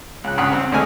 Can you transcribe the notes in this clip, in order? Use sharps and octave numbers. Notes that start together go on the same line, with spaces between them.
C#2 F#6
G2 C#3 F#5 D#6
C4
D2 D3 G#3 D#5 G#5 F6